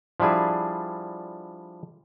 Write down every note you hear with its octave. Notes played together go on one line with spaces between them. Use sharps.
F3 G3 D4 E4 G#4